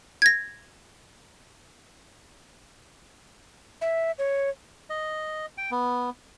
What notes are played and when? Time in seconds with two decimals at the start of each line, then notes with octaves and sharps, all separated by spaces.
0.22 G#6 A#6
3.81 E5
4.19 C#5
4.90 D#5
5.58 G5
5.71 B3